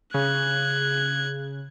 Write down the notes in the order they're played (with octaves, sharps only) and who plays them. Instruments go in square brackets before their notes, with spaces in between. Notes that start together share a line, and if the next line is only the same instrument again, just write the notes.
[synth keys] C#3 [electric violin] F#6 G#6